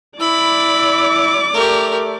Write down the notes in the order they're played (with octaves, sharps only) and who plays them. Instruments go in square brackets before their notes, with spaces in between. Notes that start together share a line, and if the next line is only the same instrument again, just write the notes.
[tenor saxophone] E4 [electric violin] D5 D6 [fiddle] B5
[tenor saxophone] A3 [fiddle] G4 A#4